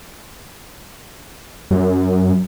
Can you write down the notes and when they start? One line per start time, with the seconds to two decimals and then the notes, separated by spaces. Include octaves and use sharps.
1.71 F#2